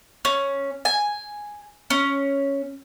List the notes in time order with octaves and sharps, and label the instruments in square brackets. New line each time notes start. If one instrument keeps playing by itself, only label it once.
[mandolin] C#4
G#5
C#4